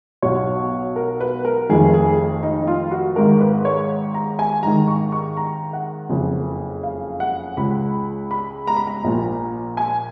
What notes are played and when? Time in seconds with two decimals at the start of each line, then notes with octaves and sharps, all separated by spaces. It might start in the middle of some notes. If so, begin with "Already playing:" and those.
0.22 B1 B2 C#5
0.96 A#4
1.21 B4
1.45 A#4
1.69 F1 F2 D#3 G#4
1.94 G#4
2.43 D#4
2.62 D#4
2.67 F4
2.91 F#4
3.16 G#1 G#2 D#3 A#4
3.41 B4
3.65 C#5
4.14 A#5
4.39 G#5
4.63 G#1 G#2 D#3 A#5
4.88 C#6
5.12 C#6
5.37 A#5
5.73 F#5
6.09 F#1 F2 C#3
6.83 F5
7.20 F#5
7.57 C#2 C#3 B5
8.31 B5
8.67 A#5
8.77 B5
8.87 A#5
9.04 A#1 A#2
9.77 G#5